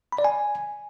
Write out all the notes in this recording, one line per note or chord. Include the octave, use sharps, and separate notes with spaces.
B5
D5
G#5